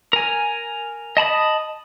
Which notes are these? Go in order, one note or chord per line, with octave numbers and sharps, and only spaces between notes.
A#4 G#5
D#5 A5 B5 D#6